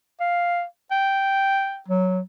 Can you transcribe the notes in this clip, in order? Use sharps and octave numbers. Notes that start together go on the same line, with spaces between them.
F5
G5
F#3